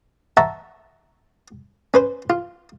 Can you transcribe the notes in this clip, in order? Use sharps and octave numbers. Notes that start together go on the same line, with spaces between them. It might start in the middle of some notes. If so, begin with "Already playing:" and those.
E5 F#5 A5 A#5 C#6
C#4 B4 C5
F4